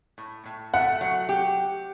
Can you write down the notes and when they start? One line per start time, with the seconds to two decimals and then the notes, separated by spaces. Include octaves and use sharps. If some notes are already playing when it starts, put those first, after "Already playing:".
0.18 A2
0.46 A2
0.74 A3 F#5
1.01 F#3
1.29 G4